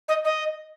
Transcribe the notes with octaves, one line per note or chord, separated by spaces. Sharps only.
D#5
D#5